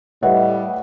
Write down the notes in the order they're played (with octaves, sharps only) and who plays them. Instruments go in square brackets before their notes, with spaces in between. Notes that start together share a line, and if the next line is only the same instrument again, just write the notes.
[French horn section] A2 G3 [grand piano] B4 C#5 E5 [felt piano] D#5 F#5